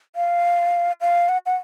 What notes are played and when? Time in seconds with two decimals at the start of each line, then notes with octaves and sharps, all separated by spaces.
0.16 F5
1.01 F5
1.29 F#5
1.46 F#5